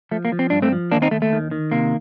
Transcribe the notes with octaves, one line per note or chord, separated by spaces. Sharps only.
F3 A3
A#3
F3
C4
G2 D4
A3 C4
F3
D#2 A#3 D4
C4 D#4
D#2 A3
A3
D#3
D#3
C3 A#3